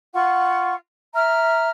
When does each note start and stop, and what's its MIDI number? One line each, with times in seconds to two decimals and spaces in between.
0.13 0.74 65
0.13 0.74 78
0.13 0.74 85
1.13 1.68 76
1.13 1.68 82
1.13 1.68 89